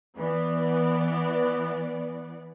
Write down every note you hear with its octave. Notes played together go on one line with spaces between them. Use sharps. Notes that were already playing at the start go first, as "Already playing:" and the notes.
E3 B3 D5